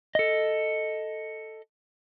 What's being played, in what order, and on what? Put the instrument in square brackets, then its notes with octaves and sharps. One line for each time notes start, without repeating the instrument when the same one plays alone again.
[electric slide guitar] A4 D#5